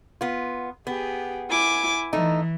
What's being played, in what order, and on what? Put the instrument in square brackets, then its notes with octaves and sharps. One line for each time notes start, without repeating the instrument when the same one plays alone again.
[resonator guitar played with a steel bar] B3 F4
[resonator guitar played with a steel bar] B3 [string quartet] G4 G#4
[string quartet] E4 G#5 D6
[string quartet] E3 [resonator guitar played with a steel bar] A3 D#4